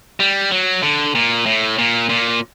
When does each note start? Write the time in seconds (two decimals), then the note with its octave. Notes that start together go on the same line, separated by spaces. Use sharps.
0.20 G3
0.51 F#3
0.83 D3
1.15 A#2
1.46 A2
1.78 A#2
2.09 A#2